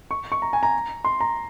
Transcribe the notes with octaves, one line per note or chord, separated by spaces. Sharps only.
C#6
C#6
A#5
G#5
A#5
C6
A#5